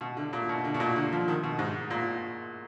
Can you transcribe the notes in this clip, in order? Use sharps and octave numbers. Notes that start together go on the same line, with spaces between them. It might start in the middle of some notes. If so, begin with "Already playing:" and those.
B2
D3
A#2
B2
D3
B2
A#2
D3
F3
D#3
B2
G#2
A#2